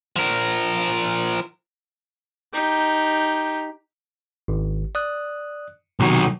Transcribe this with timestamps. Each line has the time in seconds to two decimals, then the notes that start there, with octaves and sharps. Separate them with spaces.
0.16 F3 A#4
2.54 D#4 G4
4.48 G#1
4.95 D5 D#6 F#6
6.00 B1 C3 D#3 F#3 C#6